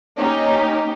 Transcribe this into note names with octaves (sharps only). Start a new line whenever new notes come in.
A#3 C#4 D#4 G4